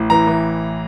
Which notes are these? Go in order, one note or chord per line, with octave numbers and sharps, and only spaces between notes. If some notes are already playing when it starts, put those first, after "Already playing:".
Already playing: A1
E3 A#5
E3